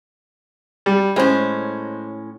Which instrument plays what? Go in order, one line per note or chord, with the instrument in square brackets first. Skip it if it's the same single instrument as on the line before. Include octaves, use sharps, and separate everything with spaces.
[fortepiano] G3
[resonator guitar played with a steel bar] A2 C#4 [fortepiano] G#3 C5